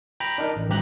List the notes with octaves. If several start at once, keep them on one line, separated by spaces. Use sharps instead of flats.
G5 A#5 B5
D4 D#4 A#4
A1
G#1 G2 C3 G4 A#5 F#6